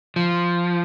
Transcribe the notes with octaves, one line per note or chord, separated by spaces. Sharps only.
F3